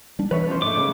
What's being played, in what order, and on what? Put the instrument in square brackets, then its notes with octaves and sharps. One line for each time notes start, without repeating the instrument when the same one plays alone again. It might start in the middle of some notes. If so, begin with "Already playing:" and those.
[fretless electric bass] G3 D4
[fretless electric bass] E3 [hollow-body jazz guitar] B4 C#5 E5
[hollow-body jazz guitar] F3 C#4 C5
[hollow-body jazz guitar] G#2 A3 [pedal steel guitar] D6
[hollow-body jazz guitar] C#3